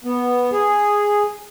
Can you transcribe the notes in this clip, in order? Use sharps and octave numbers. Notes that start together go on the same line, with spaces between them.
B3
G#4